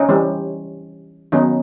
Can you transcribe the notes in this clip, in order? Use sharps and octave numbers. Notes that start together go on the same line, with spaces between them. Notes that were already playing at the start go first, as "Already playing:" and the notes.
Already playing: C#4 D#4
E3 G3 C4
D#3 F#3 B3 C#4 D#4